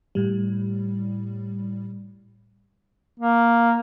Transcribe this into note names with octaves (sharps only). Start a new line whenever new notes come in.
A2 G3
A#3